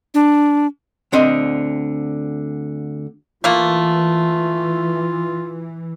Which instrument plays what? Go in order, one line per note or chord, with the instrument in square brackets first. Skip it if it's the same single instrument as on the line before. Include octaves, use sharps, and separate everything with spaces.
[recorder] D4
[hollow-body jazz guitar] D2 D3 C4 D#5
[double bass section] E3 [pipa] A3 A#3 [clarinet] F4